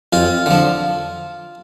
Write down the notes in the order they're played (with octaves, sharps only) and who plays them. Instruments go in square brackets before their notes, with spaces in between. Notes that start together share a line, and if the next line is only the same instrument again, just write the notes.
[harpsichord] F2 F4
D3 F3